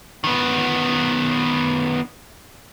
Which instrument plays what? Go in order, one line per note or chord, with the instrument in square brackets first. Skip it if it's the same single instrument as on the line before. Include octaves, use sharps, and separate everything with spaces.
[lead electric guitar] D#3 B3